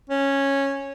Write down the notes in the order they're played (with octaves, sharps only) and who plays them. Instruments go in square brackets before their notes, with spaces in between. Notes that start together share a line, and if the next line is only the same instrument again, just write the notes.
[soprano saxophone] C#4